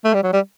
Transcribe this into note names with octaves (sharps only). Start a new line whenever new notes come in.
A3
G3
F#3
G3